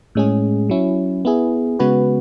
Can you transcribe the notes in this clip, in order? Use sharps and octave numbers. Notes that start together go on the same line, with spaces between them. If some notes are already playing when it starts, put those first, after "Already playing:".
A2 G#3 C#4 G#4
F#3 C#4 E4
B3 E4 G#4
C#3 G#3 B3 F#4 B4